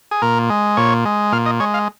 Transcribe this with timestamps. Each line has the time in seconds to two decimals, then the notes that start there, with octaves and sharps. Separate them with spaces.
0.11 G#4
0.22 A#2 A#4
0.50 G#3
0.77 A#2 C#5
1.05 G#3
1.32 A#2 F5
1.46 D#5
1.60 G#3 C#5
1.74 F5